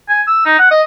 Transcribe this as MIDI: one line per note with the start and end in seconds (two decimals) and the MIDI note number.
0.09 0.22 80
0.27 0.45 88
0.46 0.56 63
0.59 0.68 78
0.71 0.82 75